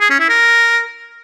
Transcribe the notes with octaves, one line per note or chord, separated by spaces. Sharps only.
G#4
C#4
E4
A#4